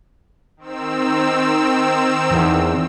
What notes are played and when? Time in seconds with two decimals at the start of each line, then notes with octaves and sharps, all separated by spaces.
0.57 D#3 C4 E6
2.31 E2